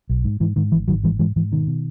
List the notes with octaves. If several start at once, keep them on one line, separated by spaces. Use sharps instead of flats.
B1
G#2
G#2 E3
G#2 D#3
G#1 E3
G#1 D#3 F#3
G#2 E3 G#3
G#2 E3 G#3
G#2 E3
B2 D#3
B2